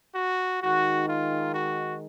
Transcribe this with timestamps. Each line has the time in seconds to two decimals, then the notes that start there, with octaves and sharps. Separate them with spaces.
0.15 F#4
0.61 D#3 G#3 D#4 F#4
1.08 F4
1.55 F#4